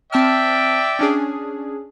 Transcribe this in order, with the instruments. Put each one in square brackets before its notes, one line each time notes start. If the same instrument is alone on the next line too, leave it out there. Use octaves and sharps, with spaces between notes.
[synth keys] C4 A5 F6 [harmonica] D5 E5 G5
[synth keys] C#4 D4 G#4